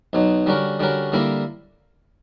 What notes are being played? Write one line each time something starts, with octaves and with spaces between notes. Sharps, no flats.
B1 B2 F#3
D3 G3 C#4 F#4 A#4
D3 G3 C#4 F#4 A#4
D3 G3 A#3 E4 A#4